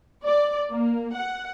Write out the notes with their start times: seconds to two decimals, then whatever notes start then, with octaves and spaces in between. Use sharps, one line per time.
0.23 D5
0.71 A#3
1.15 F#5